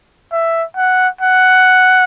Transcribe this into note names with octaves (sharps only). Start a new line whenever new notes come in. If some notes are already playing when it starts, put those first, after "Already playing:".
E5
F#5
F#5